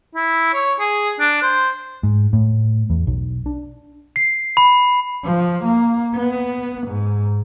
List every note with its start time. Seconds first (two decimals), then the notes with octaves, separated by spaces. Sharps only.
0.15 E4
0.53 C#5
0.80 G#4
1.20 D4
1.43 C5
2.03 G#2
2.33 A2
2.90 E2
3.07 B1
3.46 D4
4.16 C7
4.57 B5
5.25 F3
5.64 A#3
6.15 B3
6.87 G#2